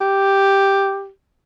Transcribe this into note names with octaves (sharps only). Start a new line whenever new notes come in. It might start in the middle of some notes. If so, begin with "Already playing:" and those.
G4